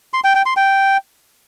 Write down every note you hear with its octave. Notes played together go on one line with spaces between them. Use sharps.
C6
G5
G5
C6
G5